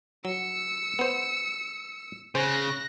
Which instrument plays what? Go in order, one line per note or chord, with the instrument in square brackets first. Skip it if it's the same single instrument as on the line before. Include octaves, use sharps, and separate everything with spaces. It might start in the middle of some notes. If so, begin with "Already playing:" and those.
[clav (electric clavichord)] F#3 [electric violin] E6 C#7
[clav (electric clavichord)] B3 C5
[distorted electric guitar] C#3 [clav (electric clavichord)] C5 [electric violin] F#6 A#6